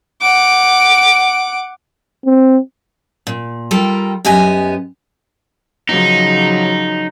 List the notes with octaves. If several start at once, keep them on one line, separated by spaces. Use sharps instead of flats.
F#5 D6
C4
A#2
G3 F4 A4 A#4 G5
F#2 B3 G4 D#5 G#5
C#3 F3 F#3 D#4